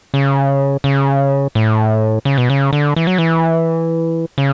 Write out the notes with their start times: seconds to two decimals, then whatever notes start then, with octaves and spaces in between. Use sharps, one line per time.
0.14 C#3
0.84 C#3
1.55 A2
2.25 C#3
2.38 B2
2.50 C#3
2.73 D3
2.96 E3
3.07 F#3
3.18 E3
4.38 C#3